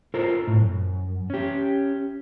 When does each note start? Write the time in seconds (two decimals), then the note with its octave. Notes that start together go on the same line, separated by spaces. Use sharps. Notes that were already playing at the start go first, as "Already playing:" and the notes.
0.14 F4 A4 A#4 C5
0.47 A2
0.62 F#2
1.30 C#4 G4